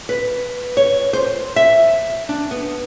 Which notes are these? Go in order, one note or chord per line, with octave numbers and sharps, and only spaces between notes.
B4
C#5
C5
E5
D4
B3